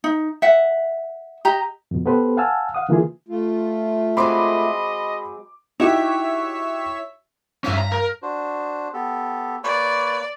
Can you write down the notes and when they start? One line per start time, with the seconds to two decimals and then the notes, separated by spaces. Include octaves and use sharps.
0.04 D#4
0.42 E5 F#5
1.45 G4 D#5 A#5
1.91 F2 B2
2.06 B3 G4 A4 B4 C5
2.37 F5 F#5 G#5 A5 E6 F6
2.74 F5 F#5 D#6
2.89 D3 E3 A#3 F4 G#4
3.29 A3 F4
4.17 F#3 G#3 C4 D#5 B5 C6 D6
5.80 D#4 E4 F#4 G4 C#5 E5 B6
7.64 G2 C#4 E5 F5 B6
7.77 A#5
7.92 A#4
8.22 D4 F#4 C5
8.93 B3 G4 A4
9.64 A#3 B4 C#5 D5